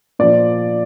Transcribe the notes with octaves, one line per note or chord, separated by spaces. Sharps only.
A#2 F3 D5